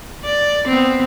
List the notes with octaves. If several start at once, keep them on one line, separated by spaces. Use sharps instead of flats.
D5
B3 C4